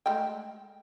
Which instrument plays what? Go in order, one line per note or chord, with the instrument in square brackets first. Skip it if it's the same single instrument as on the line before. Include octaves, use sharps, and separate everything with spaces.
[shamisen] G#3 A3 G5